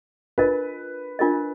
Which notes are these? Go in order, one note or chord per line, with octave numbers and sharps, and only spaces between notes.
D4 F4 A#4 B4 D#5
D4 F4 A#4 D#5